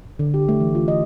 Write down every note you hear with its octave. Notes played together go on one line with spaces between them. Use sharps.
D3
G4
A3
E3
F4
D#5